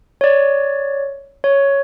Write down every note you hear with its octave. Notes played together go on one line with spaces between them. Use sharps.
C#5 D5
C#5